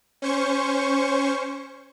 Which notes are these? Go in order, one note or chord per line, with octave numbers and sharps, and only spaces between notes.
C#4 C5 C#6